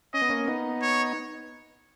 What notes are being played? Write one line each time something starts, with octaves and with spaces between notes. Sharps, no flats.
C#4 D#5
B3
A#3 C#4
B3 D#4
C#5